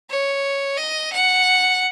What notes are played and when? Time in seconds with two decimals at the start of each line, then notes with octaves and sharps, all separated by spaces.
0.10 C#5
0.77 D#5
1.12 F#5